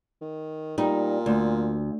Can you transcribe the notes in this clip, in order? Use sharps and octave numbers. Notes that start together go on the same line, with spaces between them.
D#3
A#2 G3 D#4
D2